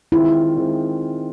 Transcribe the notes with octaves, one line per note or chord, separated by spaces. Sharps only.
D#3 G#3 C4 E4 F4
D#3 G#3 C4 F4